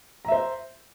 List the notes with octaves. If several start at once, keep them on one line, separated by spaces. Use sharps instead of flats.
C5 E5 A#5